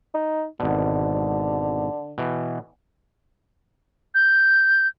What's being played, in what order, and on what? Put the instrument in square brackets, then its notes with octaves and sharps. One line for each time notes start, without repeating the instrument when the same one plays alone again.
[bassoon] D#4
[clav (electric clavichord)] G#1 B2 [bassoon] D3
[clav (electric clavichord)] B2 E3
[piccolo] G6